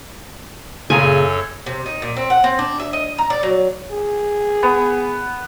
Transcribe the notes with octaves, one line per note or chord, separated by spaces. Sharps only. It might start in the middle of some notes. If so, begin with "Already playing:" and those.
F#2 A#2 C#3 G#4 A4 C#5 G#5 A#5
C3
D#4
A#2
C4
F#5
C4
D4
E5
D#5
A#5
D5
F#3
G#4
B3